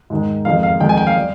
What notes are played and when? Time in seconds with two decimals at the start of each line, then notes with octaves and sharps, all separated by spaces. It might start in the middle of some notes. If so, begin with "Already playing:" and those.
0.10 G#2 D#3 G#3
0.45 F2 D#3 G#3 F5
0.63 F5
0.80 F2 D#3 G#3 G5
0.89 G#5
0.97 G5
1.07 F5
1.17 G3